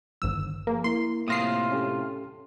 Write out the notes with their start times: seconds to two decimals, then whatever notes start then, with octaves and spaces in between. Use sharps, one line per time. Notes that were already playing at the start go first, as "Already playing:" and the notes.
0.22 G1 D3 D#3 E6
0.67 F3 A#3 G#4 A#4
0.84 A#3 E4 A#4 C6
1.28 A2 C3 A#3 F4 D#6 A#6 C7
1.72 C#4 G4 A4